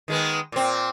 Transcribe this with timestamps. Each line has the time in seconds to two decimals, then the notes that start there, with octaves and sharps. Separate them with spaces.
0.08 D#3 G#3 B3
0.52 A#2 C4